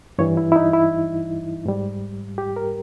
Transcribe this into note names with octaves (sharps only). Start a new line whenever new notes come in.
G2 E3 G3 C#5
E4
E4
D#4
E4
G#2 G3
G4
A#4